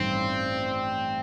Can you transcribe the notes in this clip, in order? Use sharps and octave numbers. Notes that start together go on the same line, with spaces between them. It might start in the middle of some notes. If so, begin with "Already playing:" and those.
Already playing: A1 G2 D#3 C4